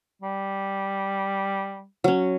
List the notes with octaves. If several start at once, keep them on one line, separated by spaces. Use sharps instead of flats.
G3
F#3 C#4